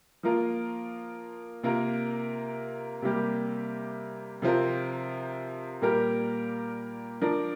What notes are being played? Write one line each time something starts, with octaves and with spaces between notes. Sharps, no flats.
F3 A#3 F4 A#4
C3 A#3 F4 A#4
C3 G3 A#3 G4
C3 F3 C4 F4 A#4
A#2 G3 A#3 G4 A#4
F3 D4 A#4